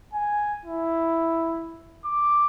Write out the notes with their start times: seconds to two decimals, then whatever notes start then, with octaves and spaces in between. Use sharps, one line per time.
0.14 G#5
0.66 E4
2.05 D6